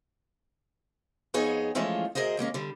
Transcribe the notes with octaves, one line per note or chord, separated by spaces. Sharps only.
F2 B3 D#4 G#4 C#5 G#5
E3 F3 G#3 A3 C#4 F4
D2 G#4 A#4 C5 D#5
D#2 G#3 A#3 C#4
D3 G3